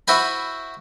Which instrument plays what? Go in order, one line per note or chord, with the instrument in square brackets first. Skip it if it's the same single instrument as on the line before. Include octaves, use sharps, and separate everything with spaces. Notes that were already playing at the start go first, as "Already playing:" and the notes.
[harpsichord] E4 F#4 C5 G#5 B5